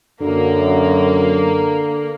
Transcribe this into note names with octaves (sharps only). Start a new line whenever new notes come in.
F#2 D3 A#3